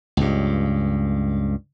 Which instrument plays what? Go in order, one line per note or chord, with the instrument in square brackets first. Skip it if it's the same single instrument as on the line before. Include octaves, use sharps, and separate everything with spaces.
[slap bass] C#2 G2